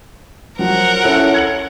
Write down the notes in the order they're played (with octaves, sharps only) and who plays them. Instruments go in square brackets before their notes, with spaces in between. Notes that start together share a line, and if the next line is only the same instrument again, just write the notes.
[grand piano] F3 F#3 [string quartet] A#4 F#5
[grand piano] C#4 E4 A4
G#6 C#7 F#7